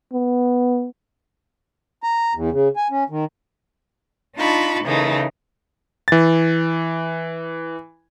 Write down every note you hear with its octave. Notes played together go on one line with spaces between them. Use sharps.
B3
A#5
E2
C#3
G#5
C#4
D#3
D4 D#4 F4 A5 B5 C#6
C#3 E3 A3 D#4 G#4 A#4
E3 A6